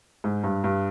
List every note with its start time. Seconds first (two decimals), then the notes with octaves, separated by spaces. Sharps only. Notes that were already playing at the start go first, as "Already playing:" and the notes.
0.24 G#2
0.44 G2
0.64 G2